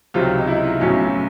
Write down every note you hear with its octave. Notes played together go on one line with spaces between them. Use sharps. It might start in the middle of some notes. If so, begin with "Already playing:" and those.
C#2 C3 D#3 F#3 F4
D#4
E4
B1 A2 F#3 C#4